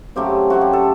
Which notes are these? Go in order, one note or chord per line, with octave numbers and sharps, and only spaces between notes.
C#3 F#3 A3 C4 G4
C#3 F#3 A3 C4 F#4
G4
A4